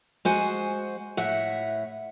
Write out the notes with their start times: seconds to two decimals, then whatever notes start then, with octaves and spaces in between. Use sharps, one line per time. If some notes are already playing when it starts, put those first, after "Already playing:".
0.25 G#3 F#4 C5 F#5 G#5
1.17 A2 E5 F#5